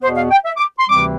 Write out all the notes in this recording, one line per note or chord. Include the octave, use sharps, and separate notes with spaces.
E2 B2 B3 C5
F5
G5
E5
D6
C6
D2 C3 E3 G3 C4 D6